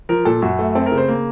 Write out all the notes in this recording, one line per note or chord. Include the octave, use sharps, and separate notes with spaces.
F3 A#4
A#2 A4
F#2 F#4
A3
C4 A4
A#4
C#3
C5
A#3